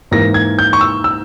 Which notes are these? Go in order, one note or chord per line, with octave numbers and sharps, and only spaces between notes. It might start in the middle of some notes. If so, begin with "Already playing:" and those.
G#2 E3 A#3 A#6
G#6
G6
C#6
E6
E6